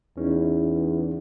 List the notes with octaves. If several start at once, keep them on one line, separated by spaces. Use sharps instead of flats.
E2 C#4 D#4 E4